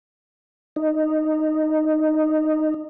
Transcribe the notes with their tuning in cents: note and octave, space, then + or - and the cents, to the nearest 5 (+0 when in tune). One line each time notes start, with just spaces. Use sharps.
D#4 -10